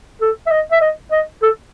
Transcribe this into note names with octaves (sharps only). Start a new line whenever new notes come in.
A4
E5
D#5
E5
D#5
D#5
A4